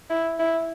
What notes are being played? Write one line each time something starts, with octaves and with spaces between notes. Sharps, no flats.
E4
E4